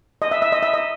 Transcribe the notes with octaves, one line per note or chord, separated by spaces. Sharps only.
D#5
E5
E5
D#5
E5
D#5